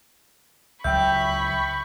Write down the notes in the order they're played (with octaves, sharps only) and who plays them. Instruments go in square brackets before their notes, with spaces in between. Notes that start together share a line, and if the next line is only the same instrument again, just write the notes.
[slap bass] C#2 F#3 [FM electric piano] E5 G5 [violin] B5 C#6 [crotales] G6